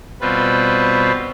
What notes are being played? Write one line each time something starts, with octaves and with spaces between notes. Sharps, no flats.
B2 G3 C4 F4 B4